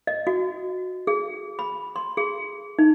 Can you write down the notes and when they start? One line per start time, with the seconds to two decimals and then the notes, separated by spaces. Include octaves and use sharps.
0.07 D#5
0.27 F#4
1.07 G#4
1.59 B5
1.96 C6
2.17 G#4
2.79 D#4